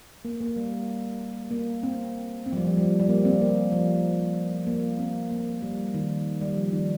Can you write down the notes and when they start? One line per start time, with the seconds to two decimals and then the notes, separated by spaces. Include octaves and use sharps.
0.25 A#3
0.40 A#3
0.56 G3
1.51 A#3
1.83 C4
2.46 C4
2.53 F3
2.56 G3
2.67 F3
2.77 G3
3.00 G3
3.09 A#3
3.25 C4
3.41 A#3
3.72 F3
4.67 A#3
4.99 C4
5.31 A#3
5.62 G3
5.94 D#3
6.41 G3
6.57 F3
6.73 D#3